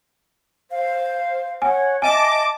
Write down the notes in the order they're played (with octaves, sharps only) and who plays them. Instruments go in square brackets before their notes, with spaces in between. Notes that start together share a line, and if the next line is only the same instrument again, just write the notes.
[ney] C5 [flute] F5
[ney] C#5 [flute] F#5 [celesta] G#5
[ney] D#5 [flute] E5 [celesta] G#5 D#7 [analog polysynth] A5 D6